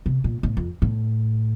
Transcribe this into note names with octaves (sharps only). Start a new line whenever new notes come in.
C3
A#2
A2
F2
A2